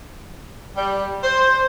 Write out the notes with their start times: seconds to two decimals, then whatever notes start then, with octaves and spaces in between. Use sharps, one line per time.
0.77 G3
1.24 C5